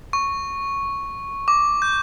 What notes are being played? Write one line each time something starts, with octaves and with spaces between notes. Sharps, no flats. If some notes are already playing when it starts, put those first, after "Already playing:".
C#6
D6
G6